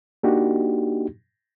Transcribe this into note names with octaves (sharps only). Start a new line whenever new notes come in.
A#3 D4 D#4 F#4 G4